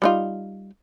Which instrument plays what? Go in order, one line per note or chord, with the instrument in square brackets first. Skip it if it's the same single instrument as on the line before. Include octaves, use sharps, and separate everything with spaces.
[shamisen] G3 D#4 F4